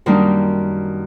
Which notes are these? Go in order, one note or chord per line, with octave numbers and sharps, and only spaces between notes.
F#2 D#3 G3 A#3 D4 D#4